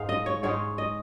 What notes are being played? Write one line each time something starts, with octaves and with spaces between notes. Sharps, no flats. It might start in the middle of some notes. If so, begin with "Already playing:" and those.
Already playing: G#2 G#3 D#4 F5
D#5
C#5
G#2 G#3 D#4 C#5
D#5